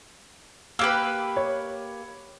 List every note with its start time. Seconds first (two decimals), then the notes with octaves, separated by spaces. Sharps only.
0.79 A#3 G4 B4 E6
1.37 C#5